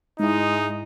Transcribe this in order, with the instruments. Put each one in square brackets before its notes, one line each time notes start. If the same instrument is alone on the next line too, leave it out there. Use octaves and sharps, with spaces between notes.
[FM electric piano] G#2 E4 [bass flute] G#3 [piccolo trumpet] D#4